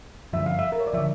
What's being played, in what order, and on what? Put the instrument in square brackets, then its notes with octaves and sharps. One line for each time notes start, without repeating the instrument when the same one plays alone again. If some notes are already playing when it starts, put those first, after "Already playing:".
[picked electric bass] G2 D3 F3 [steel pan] E5
[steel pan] F5
E5
A#4
C#5
D5
[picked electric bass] D3 F3 [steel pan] E5